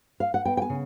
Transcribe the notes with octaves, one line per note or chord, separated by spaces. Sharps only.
F5
F#5
B3 G5
G5
G#5
C#3